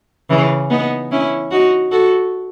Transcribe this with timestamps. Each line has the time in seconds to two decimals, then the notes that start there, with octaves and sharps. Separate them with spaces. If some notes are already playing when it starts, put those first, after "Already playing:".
0.30 C#3 E3
0.70 B3 D#4
1.11 C#4 E4
1.51 D#4 F#4
1.91 F#4 A4